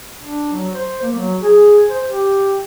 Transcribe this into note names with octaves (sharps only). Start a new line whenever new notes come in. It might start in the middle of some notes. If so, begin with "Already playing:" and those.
D4
F#3
C5
A#3
F#3
G#4
C5
G4